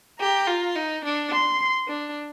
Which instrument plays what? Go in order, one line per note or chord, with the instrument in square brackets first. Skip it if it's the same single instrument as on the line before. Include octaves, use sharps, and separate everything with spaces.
[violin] G4 [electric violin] A#5
[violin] F4
D#4
D4
[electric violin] C6
[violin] D4